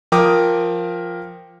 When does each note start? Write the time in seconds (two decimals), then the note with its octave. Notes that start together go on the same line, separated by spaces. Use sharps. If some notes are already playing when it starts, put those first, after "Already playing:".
0.12 F3 A#4 G5 D6 D#6